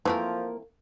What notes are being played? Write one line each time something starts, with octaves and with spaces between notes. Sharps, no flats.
E3 F3 A3 A#3 C4 A#4